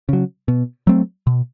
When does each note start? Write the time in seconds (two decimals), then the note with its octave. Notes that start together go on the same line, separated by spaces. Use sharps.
0.09 C#3 F#3
0.48 B2
0.87 F#3 A3 C4
1.27 B2